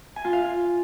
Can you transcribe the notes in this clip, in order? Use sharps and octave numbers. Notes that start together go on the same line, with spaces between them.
G#5
F4
F5